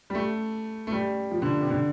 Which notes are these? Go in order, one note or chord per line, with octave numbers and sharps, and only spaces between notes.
G3
A3
A3
G3
F3
D3
C3
D3